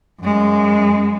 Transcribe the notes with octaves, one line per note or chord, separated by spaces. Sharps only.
F#2 G#3